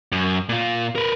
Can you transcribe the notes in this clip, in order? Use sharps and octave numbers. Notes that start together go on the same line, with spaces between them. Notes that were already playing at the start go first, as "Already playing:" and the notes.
F#2
A#2 F4
A#4 B4